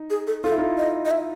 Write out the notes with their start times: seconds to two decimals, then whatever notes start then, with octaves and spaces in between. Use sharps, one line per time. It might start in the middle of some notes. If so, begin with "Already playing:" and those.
Already playing: D#4
0.10 G#4
0.27 A4
0.44 F4 A4
0.51 E4
0.58 D#4 F4
0.78 D#5
1.05 D#5
1.11 E5